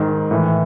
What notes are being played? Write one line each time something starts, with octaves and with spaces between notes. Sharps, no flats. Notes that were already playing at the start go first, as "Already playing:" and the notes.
Already playing: G#2 D#3
A2 E3